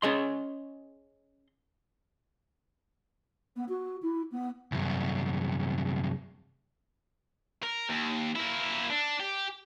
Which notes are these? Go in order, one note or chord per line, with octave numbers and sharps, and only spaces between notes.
C#4 G#4 D#5 C6
B3
F#4
E4
B3
C2 F#2
A#4
D#2
A#3 E4
D4
G4